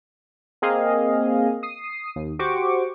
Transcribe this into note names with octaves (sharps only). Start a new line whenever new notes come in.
A#3 C4 G#4 D#5 F5
D#6 C7
D#2
F#4 G4 C5 C#6 D6